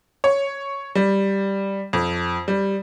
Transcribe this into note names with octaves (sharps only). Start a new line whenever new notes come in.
C#5
G3
F2
G3